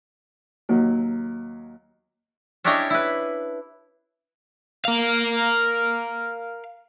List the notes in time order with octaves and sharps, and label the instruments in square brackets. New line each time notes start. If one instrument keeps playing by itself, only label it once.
[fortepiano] D#2 F#3
[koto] C#4 D4 E4 G4 C#5 D#5
E4 B4
[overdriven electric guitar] A#4 F5